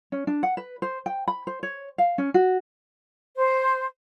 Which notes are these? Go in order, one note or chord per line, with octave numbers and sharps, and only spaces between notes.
C#4
D4
F#5
B4
C5
G5
B5
C5
C#5
F5
C#4
F#4
C5